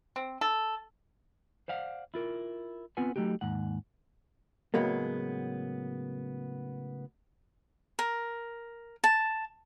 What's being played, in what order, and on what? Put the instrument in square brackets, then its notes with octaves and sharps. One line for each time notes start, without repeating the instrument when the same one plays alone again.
[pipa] C4
A4
[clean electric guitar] C5 D5 F5 F#5
E4 F4 A#4
B3 C4 F4 B4 F#5 G#5
F#3 A3 D#4 F#4 G4
D#2 G#2 F#5
[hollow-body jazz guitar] A2 C#3 F#3 G#3 A#3 B3
[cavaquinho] A#4
A5